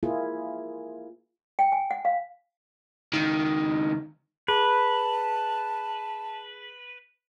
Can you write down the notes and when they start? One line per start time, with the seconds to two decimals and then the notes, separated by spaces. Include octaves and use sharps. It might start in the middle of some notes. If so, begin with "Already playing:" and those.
0.03 A#3 E4 F4 G#4
1.59 G5
1.72 G#5
1.91 F#5
2.05 F5
3.13 C#2 D#3
4.48 G#4 B4 A5